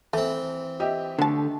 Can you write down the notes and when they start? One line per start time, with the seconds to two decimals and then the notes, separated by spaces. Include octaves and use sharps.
0.13 E3 A3 C4
0.80 G4 D#5 E5
1.19 D3 F#3 A3 A5